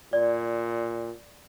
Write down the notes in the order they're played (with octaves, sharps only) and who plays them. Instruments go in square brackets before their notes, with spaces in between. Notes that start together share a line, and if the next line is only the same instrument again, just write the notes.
[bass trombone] A#2 [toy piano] D5